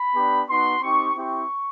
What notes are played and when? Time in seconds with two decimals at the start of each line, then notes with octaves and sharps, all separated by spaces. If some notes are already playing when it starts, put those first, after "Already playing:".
Already playing: B5
0.15 B3 D4 G4
0.48 B3 D#4 F#4 C6
0.82 C4 D#4 G4 C#6
1.16 C4 E4 G4 C#6